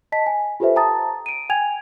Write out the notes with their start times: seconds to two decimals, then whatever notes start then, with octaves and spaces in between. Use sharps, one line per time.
0.12 D#5 A5 B6
0.26 G#5
0.60 F4 G4 A4 B4 C5 E5
0.76 G5 A5 A#5 D#6 A6
1.26 D7 D#7
1.50 G5 G#5 G#6 F7